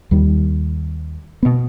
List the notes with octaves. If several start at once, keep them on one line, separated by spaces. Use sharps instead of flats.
D#2 D#3 G3
B2 G#3 B3